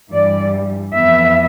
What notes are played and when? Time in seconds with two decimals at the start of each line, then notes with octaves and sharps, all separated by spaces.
0.13 G2 E3 G3 D5
0.94 F2 E3 B3 E5